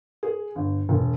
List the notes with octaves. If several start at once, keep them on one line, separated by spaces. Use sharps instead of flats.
G#4
G1
E1